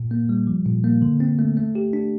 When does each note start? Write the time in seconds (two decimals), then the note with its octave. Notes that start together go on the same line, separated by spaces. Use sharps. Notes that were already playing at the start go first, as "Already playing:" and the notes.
Already playing: A#2
0.11 A#3
0.29 G3
0.47 F3
0.66 A#2
0.84 A#3
1.02 D3
1.20 C4
1.39 A3
1.57 A3
1.75 G4
1.93 D4